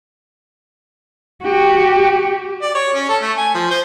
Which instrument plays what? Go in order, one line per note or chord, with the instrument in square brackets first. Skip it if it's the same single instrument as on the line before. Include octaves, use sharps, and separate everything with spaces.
[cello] F#4 [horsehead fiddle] G4
[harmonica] D5
C#5
C#4
A4
A3
G#5
F3
C5